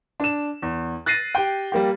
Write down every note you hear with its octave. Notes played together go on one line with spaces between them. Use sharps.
D4 E7
E2
F#6 A6 A#6 C7 D#7
G4 G5
G3 A#3 G4